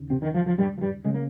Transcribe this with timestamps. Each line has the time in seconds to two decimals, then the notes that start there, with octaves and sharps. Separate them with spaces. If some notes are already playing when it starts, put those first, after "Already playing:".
Already playing: D#2 C#3
0.10 C3 C4
0.22 D#3
0.34 F3
0.46 F3
0.58 G2 G3
0.78 F3
0.81 G2 G3
1.04 C#3 G#3
1.14 A#3